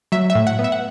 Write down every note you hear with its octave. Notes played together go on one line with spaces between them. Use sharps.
F#3 E5
E5
A2
F#5
B3
E5
F#5